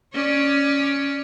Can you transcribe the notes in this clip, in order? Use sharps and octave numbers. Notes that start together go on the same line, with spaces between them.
C#4 C#5 D5